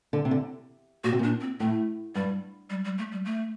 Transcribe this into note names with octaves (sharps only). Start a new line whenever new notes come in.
D3
C3
D3
A#2 F#4
C3
A#2 D4
C4
A2 A3
G2 G3
G3
G3
A3
G3
A3